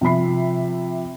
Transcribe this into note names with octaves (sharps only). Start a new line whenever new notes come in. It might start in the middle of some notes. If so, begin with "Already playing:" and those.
C3 F3 E5 B5 C7